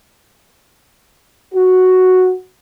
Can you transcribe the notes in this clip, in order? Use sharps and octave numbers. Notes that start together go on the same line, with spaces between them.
F#4